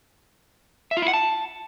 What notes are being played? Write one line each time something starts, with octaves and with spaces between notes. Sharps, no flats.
E5
F4
E4
F#5
A5